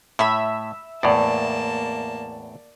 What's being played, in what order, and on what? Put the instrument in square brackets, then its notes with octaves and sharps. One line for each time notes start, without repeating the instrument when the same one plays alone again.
[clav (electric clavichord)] A2 [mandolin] E5 B5
[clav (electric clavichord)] E2 A2 [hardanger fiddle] A#3 A5 [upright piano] D5